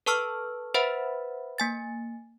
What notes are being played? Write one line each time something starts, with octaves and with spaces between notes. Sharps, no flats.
A4 B4 A5 C#6 E6 F6
B4 C5 E5 F#5 B5
A#3 G#5 A6